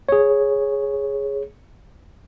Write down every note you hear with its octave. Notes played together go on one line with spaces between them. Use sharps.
G#4 C#5